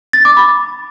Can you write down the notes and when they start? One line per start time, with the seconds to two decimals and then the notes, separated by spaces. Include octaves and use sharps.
0.13 A6
0.25 D6
0.37 B5